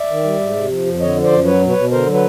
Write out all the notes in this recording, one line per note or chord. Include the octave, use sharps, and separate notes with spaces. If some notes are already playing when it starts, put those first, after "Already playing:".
Already playing: D5 E5
D#3
G3
G#2
C3
F3
F2
D3 C#5 D#5
F3
C5 D5
F#2
F#3 B4 C#5
B2
B4 C#5
B2
D3 A#4 C5
F#3
B4